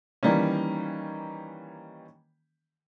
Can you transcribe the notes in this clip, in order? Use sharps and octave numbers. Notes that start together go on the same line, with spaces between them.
D#3 E3 G3 A#3 C#4